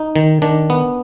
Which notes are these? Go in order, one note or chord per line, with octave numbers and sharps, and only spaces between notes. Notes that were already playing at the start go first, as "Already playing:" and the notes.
Already playing: D#4
D#3
D#3 D4
B3